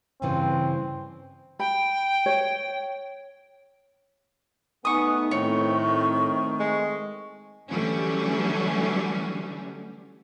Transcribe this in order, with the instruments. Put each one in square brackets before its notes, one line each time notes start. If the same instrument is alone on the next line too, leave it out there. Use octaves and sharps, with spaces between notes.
[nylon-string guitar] G2 C#3 E3 [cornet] C4
[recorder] G5 [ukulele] B5
[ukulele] C#5
[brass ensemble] A3 B3 D#4 [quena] G#5 [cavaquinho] C#6 D#6
[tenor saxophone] A2 [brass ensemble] D#3 A3 C4 [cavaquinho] C#5 [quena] C#6
[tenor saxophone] G#3
[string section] D3 E3 F#3 G3 A3 C#4